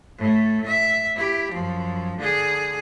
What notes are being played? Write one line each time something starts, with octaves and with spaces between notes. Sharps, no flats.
A2 A3
E5
E4 G4
F#2 F3
D3 G#4